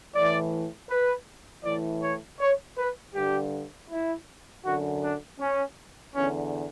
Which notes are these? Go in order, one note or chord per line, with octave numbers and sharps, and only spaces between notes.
A2 E3 D5
B4
A2 E3 D5
C#5
C#5
B4
G2 D3 G4
E4
F#2 D3 F#4
D4
C#4
E2 D3 C#4